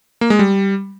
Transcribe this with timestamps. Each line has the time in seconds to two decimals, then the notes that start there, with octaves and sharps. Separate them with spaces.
0.21 A#3
0.30 G#3
0.39 G3